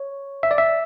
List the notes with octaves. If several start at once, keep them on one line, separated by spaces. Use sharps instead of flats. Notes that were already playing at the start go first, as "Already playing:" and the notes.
Already playing: C#5
E5
D5
E5